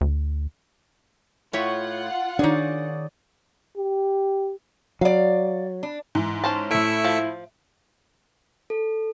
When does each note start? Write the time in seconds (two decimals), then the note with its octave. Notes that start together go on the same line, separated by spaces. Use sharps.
0.01 D2
1.53 A2 F4 C#5 E5 F#5
2.39 D#3 D4 D#4 G#4 C#5 D5
3.78 G4
5.01 F#3 D5 F5
5.83 D4
6.15 G#2 E3
6.44 C#4 C5 A5
6.71 A2 A3 E4 E5 C#7 D7
7.04 F3
8.70 A4